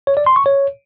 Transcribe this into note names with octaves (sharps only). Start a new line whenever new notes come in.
C#5
D5
C6
C#6
C#5